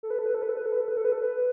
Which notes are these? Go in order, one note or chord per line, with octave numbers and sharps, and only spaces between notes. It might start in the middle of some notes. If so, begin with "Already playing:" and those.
A4
B4
A4
B4
A4
B4
A4
B4
A4
B4
A4
B4
A4
B4
A4
B4